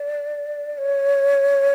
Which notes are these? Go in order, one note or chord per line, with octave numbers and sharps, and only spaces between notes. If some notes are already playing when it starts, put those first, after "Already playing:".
Already playing: D5
C#5